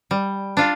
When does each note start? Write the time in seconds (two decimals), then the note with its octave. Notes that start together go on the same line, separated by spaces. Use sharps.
0.11 G3
0.57 D4 F4